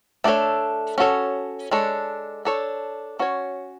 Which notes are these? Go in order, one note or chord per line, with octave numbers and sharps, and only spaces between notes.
A3 D4 A4 C#5
C#4 F#4 A4 C#5
G#3 D4 A4 C#5
D4 A4 C#5
C#4 F#4 C#5